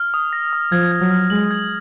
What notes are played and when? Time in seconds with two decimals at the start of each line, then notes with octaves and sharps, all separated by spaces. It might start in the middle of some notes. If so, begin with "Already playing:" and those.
Already playing: F6
0.14 D#6
0.33 A#6
0.53 D#6
0.72 F3 G#6
0.92 G#6
1.01 F#3
1.11 F6
1.30 G#3 F#7
1.51 G#6